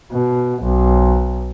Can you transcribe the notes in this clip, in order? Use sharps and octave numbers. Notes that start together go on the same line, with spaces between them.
B2
B1